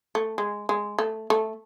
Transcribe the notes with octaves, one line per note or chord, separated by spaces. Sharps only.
A3
G#3
G#3
A3
A3